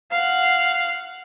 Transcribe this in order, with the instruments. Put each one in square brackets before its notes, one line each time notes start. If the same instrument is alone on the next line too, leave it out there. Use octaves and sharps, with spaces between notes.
[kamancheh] F5 F#5